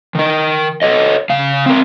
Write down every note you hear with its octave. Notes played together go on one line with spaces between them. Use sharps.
D#3 A#4
A4 C#5 D#5
C#3 F5
C4 A#4